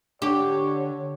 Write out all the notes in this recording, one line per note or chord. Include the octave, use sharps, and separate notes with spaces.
D3 D4 G4 C#5 C#6